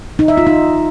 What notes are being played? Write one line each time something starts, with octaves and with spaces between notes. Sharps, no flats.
D#4
E5
F4
D#4